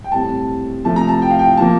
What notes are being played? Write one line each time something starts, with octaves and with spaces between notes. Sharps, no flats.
G5
A2 G3 C4 A5
C3 F3 A3 C4 A5
A#5
A5
G5
F5
G5
F3 A#3 A5